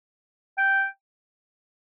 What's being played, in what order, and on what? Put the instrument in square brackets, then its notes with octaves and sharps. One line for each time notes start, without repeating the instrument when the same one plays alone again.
[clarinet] G5